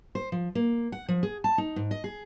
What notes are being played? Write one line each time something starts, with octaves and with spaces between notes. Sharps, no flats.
C5
F3
A#3
F#5
F3
G#4
A5
D#4
G#2
D#5
G#4